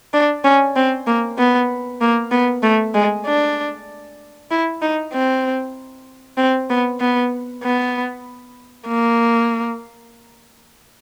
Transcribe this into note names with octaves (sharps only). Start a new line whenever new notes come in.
D4
C#4
C4
A#3
B3
A#3
B3
A3
G#3
D4
E4
D#4
C4
C4
B3
B3
B3
A#3